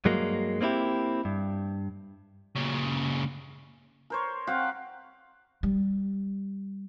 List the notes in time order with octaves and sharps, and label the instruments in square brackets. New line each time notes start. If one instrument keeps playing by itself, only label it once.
[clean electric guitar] G2 F#3 G#3 A#3
A#3 C4 D#4 E4 G4
G2
[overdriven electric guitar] A#2 C#3
[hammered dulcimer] A#4 C5 C#5
C4 G4 F5 F#5
[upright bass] G3